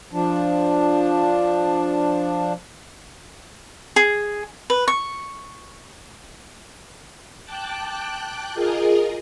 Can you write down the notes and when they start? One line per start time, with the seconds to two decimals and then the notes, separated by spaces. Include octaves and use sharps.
0.13 F3 D4
3.96 G#4
4.70 B4
4.88 C#6
7.45 G5 A5 D6 F#6
8.54 F4 G#4 A#4 D#5